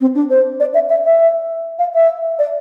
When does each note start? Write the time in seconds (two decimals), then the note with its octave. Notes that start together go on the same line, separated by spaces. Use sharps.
0.01 C4
0.15 D4
0.30 C5
0.60 D5
0.74 E5
0.89 E5
1.05 E5
1.79 F5
1.94 E5
2.39 D5